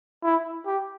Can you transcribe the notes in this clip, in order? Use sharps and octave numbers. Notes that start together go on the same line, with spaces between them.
E4
G4